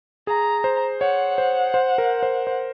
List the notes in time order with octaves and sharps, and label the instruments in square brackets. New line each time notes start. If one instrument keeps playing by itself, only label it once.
[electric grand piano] G#4 [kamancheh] A#5
[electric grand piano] C5
[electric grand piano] C#5 [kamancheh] F#5
[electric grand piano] C5
C5
A#4
C5
C5